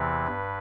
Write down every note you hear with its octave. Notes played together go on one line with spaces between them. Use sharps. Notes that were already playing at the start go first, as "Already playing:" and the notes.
Already playing: E2 C3 E3 B4
G2